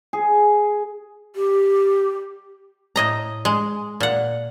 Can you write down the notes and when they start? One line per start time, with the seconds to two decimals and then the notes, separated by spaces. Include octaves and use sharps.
0.13 G#4
1.36 G4
2.96 A2 D#5 A#5
3.45 G#3
4.00 A#2 F#5